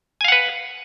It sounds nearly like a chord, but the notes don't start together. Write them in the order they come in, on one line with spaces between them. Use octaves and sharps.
G#5 F5 F#5 B4